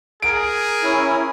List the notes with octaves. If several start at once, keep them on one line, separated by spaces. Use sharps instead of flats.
G#4 A#4 D7
C#4 E4